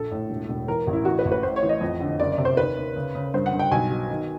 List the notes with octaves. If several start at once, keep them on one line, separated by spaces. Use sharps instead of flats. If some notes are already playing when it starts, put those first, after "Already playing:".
Already playing: A#1 A4
A2
E1
E1
E3 A#4
A1
E4
E3 F#4
B4
A1
B4
A2 C5
C#5
E3
D#5
F2
D3
F#1 D5
D5
C3
C5
D#2 B4
D#2
C#3
C#3
G2 C5
F#5
G2
G5
B1 G#5
B2
D#3